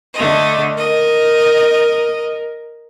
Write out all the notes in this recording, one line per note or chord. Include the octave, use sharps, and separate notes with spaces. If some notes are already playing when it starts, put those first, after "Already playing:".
D3 A3 D#5
A#4 D#5